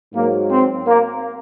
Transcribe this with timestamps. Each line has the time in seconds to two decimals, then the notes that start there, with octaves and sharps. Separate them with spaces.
0.14 G#2 F#3 A#3
0.51 C4
0.87 A#3